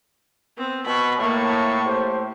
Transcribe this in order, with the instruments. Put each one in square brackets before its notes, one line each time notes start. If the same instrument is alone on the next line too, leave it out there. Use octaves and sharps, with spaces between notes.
[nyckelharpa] B3 C4
[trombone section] B2 [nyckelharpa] B5 C#6
[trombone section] A2 [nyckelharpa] A#3 C#6
[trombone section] A2 G4 C5